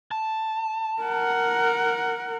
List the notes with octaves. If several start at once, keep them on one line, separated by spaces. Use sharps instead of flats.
A5
A#4 F#5